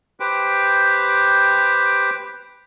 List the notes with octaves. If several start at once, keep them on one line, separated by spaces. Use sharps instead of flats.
G4 B4 C5 G5